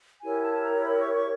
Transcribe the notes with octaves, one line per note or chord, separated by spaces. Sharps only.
E4 G4 A#4 C#5 G#5
A5
A#5
B5
C#6
C#6